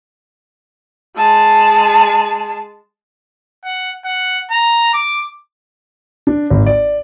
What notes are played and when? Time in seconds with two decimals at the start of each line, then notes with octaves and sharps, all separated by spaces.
1.17 G#3 A5
3.65 F#5
4.05 F#5
4.51 A#5
4.94 D6
6.27 D4
6.50 G#1
6.66 D5